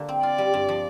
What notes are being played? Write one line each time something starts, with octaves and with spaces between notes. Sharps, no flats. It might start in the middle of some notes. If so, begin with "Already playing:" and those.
Already playing: D3 A#3
C4
F4 D5
G3
G2
F3